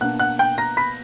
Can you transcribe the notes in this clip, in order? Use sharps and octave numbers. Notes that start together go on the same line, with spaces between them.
B2 A#3 D4 F#5 F#6
F#5 F#6
G5 G6
A#5 A#6
B5 B6